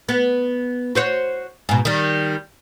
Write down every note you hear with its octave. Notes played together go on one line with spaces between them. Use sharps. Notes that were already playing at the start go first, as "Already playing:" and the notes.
B3
F#4 C5 C#5
G#2 B2
D#3 G3